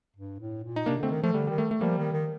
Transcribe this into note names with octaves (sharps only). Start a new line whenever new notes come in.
G2
A2
A#2
D#4
C3 A#3 D4
D3 A3 C4
D#3
F3 A3
D3 G3
D#3 G3
A3
A3
F3 G3 A#3
D#3
D#3